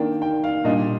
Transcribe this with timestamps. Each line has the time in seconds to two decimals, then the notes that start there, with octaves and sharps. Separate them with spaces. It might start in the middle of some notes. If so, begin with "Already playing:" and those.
Already playing: D#3 A#3 D4 G5
0.22 G5
0.44 F5
0.65 A#2 G3 D4 D#5